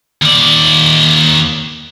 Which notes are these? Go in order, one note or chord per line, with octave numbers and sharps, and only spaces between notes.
D#2 D5